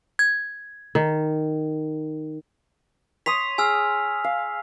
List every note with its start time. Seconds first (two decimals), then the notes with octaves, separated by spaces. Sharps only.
0.19 G#6
0.95 D#3
3.26 C#5 C6 D#6 B6 F7
3.58 G#4 G#5 E6 F6
4.24 F5